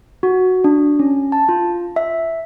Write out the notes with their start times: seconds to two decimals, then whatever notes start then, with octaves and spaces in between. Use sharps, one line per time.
0.23 F#4
0.64 D4
1.00 C#4
1.32 A5
1.49 F4
1.96 E5